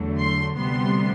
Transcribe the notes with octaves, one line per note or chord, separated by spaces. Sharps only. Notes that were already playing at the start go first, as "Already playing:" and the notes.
Already playing: E2 D3 F#3 A3
C6
D2 C3 G3 B3 C6